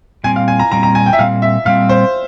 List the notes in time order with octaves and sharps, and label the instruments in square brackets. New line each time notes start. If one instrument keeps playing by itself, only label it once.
[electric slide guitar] A#2 G3 C4 [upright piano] G#5
[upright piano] F5
G#5
A#5
[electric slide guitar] A#2 G3 C4 [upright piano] A#5
[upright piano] A#5
G#5
G5
E5
[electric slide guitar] A#2 G3 C4 [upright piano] F5
[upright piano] E5
[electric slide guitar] A#2 G3 C4 [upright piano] F5
[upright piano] C5